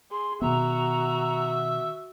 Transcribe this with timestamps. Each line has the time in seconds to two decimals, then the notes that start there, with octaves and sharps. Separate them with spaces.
0.11 G#4 C6
0.42 B2 D#3 B3 F#4 E5 A#5